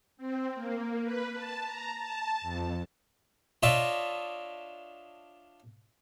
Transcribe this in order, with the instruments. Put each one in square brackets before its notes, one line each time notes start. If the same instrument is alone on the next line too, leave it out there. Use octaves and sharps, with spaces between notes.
[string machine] C4
A#3
B4
A5
A#5
A5
F2
[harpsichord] D4 F4 C#5 D#5 E5 A5